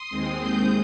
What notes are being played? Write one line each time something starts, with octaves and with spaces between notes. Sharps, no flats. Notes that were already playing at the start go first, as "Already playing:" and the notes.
Already playing: C6 D#6
D#2 D#3 G#3 C4
D#6 G6